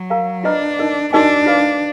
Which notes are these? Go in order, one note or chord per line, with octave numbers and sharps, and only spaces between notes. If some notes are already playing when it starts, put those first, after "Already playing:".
Already playing: F#3
A#4 F5 A#5
D4 F4 B4 D#5 A#5
D#4 A#4 D#5
D4 D#4 F#4 A#4 D#5 G#5
F4 B4 F5